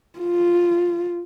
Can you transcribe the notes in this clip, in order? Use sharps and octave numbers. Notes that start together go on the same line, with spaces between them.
F4